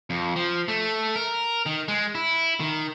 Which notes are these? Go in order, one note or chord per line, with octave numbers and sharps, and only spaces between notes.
F2
F3
A3
A#4
D#3
G#3
E4
D#3